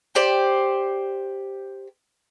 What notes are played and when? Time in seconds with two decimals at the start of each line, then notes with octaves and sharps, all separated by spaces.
0.15 G4 C5 D5